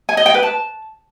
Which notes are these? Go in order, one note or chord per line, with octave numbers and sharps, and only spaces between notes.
G#5
D#5
G5
B4
A5